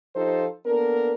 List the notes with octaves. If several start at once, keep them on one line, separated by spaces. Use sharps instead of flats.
F3 D#4 F4 G4 A4 C5
A#3 B3 D4 A4 A#4